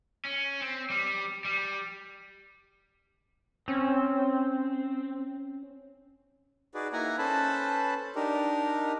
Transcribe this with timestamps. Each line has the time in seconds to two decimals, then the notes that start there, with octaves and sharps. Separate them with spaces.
0.25 C#4
0.61 C4
0.90 G3
1.45 G3
3.68 C4 C#4
6.75 D#4 F#4 G#4 B4 D5
6.93 A#3 D#4 E4 F#5 G#5 A#5
7.18 C#4 A4 B4 C5 A5 B5
8.15 D4 D#4 G4 A#4